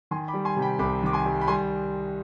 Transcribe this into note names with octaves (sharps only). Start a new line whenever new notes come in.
D#3 G#5 C6
B5 D6
G3
G#5 C6
C3
G5 B5
C2 B5 D6
D#3 D6
G#5 C6
G3
B5
G3 G#5 C6